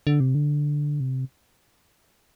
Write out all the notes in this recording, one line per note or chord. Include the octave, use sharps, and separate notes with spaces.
D3
C3
D3
C3